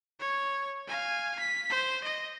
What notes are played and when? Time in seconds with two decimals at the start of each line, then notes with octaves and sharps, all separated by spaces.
0.20 C#5
0.87 F5 G#5
1.39 B6
1.70 C5
2.04 D#5